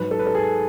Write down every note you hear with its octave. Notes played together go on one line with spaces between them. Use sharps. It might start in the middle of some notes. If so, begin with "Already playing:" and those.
Already playing: G#2 F#3 B4
A4
B4
A4
G#4